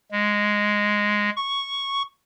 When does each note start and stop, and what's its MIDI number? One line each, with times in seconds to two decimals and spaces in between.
0.12 1.30 56
1.37 2.03 85